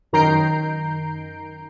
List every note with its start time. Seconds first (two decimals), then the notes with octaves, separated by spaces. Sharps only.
0.13 F#2 D#3 A#5 G6 C7 D7